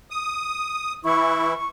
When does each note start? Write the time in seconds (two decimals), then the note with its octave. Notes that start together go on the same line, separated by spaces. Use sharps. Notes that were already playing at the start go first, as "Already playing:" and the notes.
0.11 D#6
1.05 E3 E4 C#6